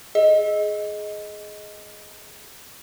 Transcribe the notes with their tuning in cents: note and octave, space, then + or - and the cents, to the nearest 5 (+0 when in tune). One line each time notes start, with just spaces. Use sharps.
G#4 +20 D#5 +5